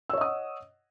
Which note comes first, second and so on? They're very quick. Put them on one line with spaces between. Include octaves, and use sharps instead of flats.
E6 C#5 D#5 D#6 F#5